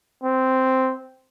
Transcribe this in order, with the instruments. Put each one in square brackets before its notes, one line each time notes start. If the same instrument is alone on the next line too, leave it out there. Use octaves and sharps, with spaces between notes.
[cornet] C4